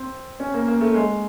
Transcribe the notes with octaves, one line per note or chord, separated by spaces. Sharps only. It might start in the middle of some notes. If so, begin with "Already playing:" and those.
Already playing: C4
C#4
A#3
A#3
A3
G#3